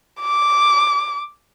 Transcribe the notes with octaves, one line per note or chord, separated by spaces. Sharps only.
D6